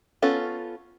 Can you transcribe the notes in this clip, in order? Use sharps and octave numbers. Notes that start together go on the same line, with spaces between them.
B3 C#4 F4 A4